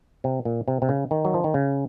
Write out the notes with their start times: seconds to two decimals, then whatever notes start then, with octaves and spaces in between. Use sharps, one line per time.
0.24 C3
0.45 A#2
0.68 C3
0.82 C3
0.89 C#3
1.11 D#3
1.25 F#3
1.34 F3
1.44 D#3
1.54 C#3